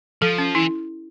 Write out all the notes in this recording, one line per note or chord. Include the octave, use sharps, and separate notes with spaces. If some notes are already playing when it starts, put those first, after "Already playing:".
F3 A4
C#4
E3 E4